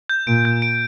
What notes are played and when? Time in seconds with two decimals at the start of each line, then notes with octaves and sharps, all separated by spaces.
0.10 G6
0.27 A#2 D7
0.45 G6
0.62 D7